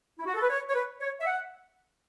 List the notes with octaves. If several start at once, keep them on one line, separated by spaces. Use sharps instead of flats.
E4
F#4
A4
B4
C#5
C#5
B4
C#5
E5
F#5